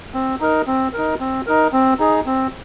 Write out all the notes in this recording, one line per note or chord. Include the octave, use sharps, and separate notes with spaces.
C4
D#4 A#4
C4
D#4 A#4
C4
D#4 A#4
C4
D#4 G#4
C4